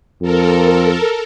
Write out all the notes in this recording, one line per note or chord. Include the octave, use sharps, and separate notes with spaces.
F2 A4 A#4